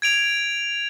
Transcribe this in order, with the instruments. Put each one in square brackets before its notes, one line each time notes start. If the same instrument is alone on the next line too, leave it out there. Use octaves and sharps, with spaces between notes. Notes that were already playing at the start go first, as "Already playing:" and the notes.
[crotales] G#6 D7 F7